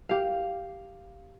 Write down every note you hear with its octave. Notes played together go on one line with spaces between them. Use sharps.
G4 F5